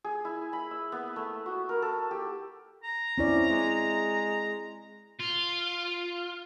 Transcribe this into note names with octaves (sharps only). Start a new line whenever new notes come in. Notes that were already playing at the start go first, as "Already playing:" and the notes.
G#4
E4
B5
E5
B3
A3
F#4
A#4
A4
G4
A#5
C4 C#4 E4 D5
G#3
F4